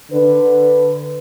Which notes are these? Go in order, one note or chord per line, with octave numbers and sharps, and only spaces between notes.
D3 B4